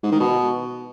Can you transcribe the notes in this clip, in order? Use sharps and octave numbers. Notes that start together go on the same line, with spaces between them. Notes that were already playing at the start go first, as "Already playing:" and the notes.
G#2
D#3
B2